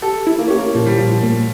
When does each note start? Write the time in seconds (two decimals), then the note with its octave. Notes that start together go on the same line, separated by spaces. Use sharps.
0.02 G4 A4
0.27 E4
0.39 A#3
0.48 C#4 G4
0.58 A#3
0.75 A#2 F3
0.87 G3
0.98 A#2 F3
1.11 F3
1.23 A#2